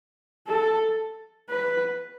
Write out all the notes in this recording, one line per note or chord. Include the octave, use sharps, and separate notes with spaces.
A4
B4